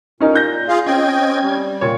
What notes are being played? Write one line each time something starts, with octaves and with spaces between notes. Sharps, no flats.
A#2 C#4 D#4 A#4
G6 A#6
F4 G#4 F5
C4 C#4 D#5 G5 G#6
G3
A#2 C#5